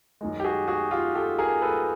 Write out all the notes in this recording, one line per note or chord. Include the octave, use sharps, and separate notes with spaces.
F#2 D#3 G#3
G4
F#4 G#4
F#4 G#4
F4 G4
G4 A4
G#4 A#4
A4 B4